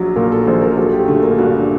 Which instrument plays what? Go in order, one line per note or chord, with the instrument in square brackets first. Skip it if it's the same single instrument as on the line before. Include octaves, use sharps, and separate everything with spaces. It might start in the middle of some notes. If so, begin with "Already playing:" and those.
Already playing: [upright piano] A#1 F#3
A#2 A#4
A4
A#1 C5
A#4
F#3 A4
G4
D3 A3
A#3
G2 F#4